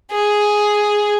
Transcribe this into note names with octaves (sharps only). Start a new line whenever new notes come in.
G#4